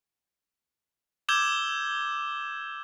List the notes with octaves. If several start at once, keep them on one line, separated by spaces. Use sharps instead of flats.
D6 E6 G6 G#6 E7 G7